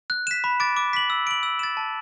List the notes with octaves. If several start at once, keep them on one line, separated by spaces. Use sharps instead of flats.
F#6
B6 E7
B5
D6 A6 D7
D6
B6 F#7
E6
D7 F#7
E6
A6 E7
A5